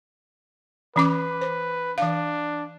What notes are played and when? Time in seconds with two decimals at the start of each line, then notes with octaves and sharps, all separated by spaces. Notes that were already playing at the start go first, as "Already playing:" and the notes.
0.96 E3 C#4 B4 D6
1.41 C5
1.98 E3 D4 F5